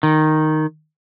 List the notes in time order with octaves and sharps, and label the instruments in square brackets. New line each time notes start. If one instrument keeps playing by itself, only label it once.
[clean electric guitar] D#3